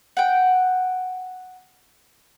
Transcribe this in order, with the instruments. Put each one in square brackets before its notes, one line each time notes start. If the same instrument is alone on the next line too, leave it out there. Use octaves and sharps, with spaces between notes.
[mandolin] F#5 G5